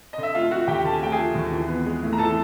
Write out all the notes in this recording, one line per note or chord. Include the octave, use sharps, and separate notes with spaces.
D3 D#5
E5
A3 F4 F5
F3 F#4 F#5
D#2 G4 G5
D3 A5
G#5
A3 G5
G#4 G#5
F3
D#2
E3
B3
G#3
A2
A#5
E3 A4 A5